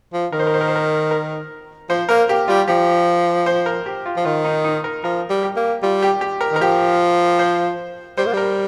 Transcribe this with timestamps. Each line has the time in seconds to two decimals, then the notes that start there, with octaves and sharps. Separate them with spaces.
0.13 F3
0.32 D#3 A#4
0.39 C5
0.47 A#4
0.54 C5
0.61 A#4
0.68 C5
0.76 A#4
1.11 A#4
1.89 F3 C5
2.09 A#3 A#4
2.29 A#3 G4
2.48 G3 F4
2.68 F3 G4
3.46 C5
3.66 A#4
3.86 G4
4.06 F4
4.16 F3
4.25 D#3 F4
4.45 D#4
4.64 D#4
4.84 A#4
5.04 F3 A#4
5.30 G3
5.43 G4
5.56 A#3
5.82 G3 F4
6.02 G4
6.21 G4
6.41 A#4
6.51 D#3
6.56 A#4
6.61 F3 G4
7.39 C5
8.17 G3 C5
8.26 A#3
8.33 G3 A#4